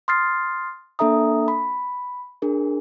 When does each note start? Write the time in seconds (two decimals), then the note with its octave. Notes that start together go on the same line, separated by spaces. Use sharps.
0.08 C6 D#6 F6 A6 C7
0.99 A#3 D4 A4 E5 A#5 D#6
1.48 B5
2.42 D4 G#4 A#4